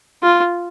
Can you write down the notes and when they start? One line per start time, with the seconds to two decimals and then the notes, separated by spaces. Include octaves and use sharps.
0.23 F4